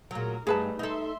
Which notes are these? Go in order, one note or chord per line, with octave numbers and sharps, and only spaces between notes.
A#2 F#3 G#4 A#4
G2 G3 A3 D#4 G#4 B4 A5
D#4 A4 E5 C6